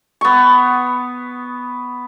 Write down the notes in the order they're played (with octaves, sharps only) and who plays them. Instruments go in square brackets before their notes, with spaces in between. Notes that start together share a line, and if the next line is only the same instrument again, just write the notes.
[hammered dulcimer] B3 C#6